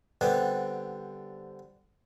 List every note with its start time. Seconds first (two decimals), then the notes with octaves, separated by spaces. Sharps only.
0.21 D3 G3 B3 C4